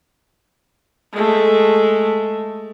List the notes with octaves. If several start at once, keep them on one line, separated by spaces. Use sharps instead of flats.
G#3 A3